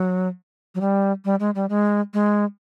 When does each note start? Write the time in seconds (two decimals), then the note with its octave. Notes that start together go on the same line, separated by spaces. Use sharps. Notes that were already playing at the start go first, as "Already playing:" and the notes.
Already playing: F#3
0.75 F#3
0.81 G3
1.25 G3
1.40 G#3
1.55 G3
1.69 G#3
2.14 G#3